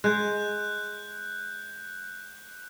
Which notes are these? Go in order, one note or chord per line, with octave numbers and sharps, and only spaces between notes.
G#3 F#6 G6